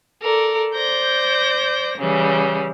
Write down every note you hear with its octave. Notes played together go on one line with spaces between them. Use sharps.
A4 A#4 D5
C5 D5 G6 A#6
C#3 E3 G3